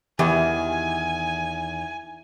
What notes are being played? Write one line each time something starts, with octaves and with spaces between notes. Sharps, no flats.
E2 D#3 E3 E4 G4 G#5